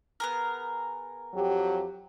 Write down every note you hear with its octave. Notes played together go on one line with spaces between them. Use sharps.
B3 G#4 A#4
F2 F#3 G4